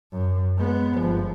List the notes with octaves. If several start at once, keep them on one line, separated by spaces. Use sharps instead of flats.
F#2
G#3 B3
G1 F3